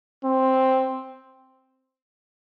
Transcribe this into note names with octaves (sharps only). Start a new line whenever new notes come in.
C4